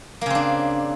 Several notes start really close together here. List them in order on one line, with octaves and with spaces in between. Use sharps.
A#3 C#3 C4 D4